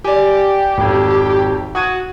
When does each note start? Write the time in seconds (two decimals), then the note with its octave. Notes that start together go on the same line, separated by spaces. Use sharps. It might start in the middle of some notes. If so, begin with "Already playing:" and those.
0.04 G4 D5 G#5
0.78 G#1 F2
1.75 F#4 D#6 G#6 D#7